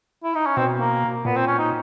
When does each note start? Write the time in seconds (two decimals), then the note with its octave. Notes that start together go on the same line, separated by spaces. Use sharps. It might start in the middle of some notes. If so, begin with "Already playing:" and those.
0.24 E4
0.35 D#4
0.46 C#4
0.57 B2 C4
0.80 A#3
1.25 A#2 B3
1.36 C4
1.47 C#4
1.58 D#4